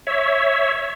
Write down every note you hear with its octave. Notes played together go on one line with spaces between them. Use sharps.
C#5 E5